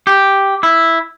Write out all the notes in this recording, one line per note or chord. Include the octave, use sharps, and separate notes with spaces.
G4
E4